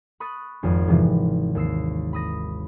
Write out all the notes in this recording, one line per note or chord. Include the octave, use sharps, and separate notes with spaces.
B5 C#6 D#6 F#6 A6
G#1 F2
G#2 C3 E3 F3
D#2 E6 C7
B5 D#6 A#6